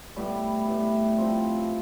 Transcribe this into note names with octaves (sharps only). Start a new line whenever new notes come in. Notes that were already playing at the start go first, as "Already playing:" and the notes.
A2 G3 B3 E4
A2 G3 B3 E4
C3 F3 C4